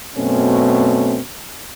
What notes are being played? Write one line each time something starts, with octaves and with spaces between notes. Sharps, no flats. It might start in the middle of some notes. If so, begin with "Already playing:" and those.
F#2 B2 A3 C4 C#4